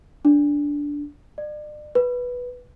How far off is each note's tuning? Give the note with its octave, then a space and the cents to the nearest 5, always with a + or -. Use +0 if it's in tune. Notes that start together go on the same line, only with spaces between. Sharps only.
D4 -10
D5 +40
B4 -5